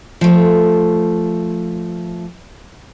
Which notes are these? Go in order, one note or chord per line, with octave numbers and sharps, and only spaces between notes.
F3 A3